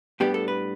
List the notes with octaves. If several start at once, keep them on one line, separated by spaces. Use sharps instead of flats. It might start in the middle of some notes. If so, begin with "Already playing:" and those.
A2 G3 B3 D4 G4
A4
B4